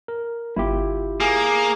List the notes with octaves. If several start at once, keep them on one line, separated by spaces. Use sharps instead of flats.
A#4
G1 E4 F4 G4
A#3 G#4